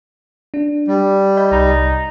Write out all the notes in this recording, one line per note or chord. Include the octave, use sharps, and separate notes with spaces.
D4
G3
D#5 B5 G6
C2 D#4